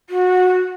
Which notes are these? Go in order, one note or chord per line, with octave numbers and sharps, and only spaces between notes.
F#4